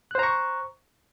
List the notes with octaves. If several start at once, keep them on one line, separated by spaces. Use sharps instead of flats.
C5 A#5 C#6 F#6